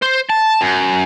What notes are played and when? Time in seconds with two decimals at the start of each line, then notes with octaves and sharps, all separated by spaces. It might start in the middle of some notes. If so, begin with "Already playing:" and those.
0.02 C5
0.30 A5
0.61 F#2